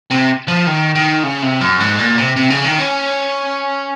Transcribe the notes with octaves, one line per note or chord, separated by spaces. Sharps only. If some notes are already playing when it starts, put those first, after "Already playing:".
C3
F3
D#3
D#3
C#3
C3
F#2
G#2
A#2
C3
C3
C#3
D#3
C#4